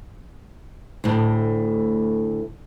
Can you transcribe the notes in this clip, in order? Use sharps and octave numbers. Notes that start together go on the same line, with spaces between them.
D2 A2